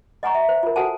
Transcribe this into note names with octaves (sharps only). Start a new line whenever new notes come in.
D#5 F#5 G#5 A#5 C#6
E5
C5
F4 A#4
F#4 A4 C5 F#5 G#5 A5